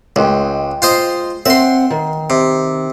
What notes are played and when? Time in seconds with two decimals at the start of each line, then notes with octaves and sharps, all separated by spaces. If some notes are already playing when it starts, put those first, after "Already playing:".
0.16 C#2 G#3 G5
0.82 F4 C5 D#5
1.46 C4 E5 F#5 C6
1.90 D#3
2.30 C3